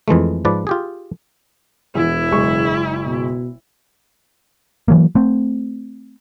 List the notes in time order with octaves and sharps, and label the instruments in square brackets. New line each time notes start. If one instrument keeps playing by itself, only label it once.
[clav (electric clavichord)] F2 E3 G#3 A3
G#2 F3 B4 D5
F4 G4 G#4
[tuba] E1 [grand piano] E2 [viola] E4
[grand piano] F#1 G#3 C#6
[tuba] B2
[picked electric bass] E3 F#3 A#3
A3 C4